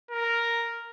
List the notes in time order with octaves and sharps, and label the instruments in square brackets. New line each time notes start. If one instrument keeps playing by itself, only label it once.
[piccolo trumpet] A#4